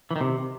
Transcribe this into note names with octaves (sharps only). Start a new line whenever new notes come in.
E3
D#3
C3